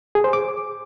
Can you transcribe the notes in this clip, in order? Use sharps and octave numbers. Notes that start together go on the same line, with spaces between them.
G#4
C5
D6